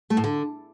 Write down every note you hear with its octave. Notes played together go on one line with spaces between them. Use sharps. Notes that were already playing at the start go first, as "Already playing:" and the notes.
A3
A2
D3